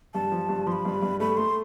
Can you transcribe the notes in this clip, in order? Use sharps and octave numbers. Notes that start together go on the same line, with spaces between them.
G2 A5
F3
G2
F3 C6
B5
G2
G2
A3 B5
A3 C6